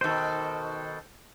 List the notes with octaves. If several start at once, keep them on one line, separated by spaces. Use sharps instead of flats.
B2 D#3 A4 C5